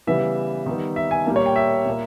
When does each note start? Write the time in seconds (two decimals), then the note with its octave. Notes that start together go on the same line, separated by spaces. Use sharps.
0.07 C#3 E3 G3 B3 E5
0.66 D#3 G3 B3
0.96 E5
1.11 G#5
1.26 A#2 G3 A#3
1.36 C#5
1.46 G5
1.56 E5
1.86 A#2 A#3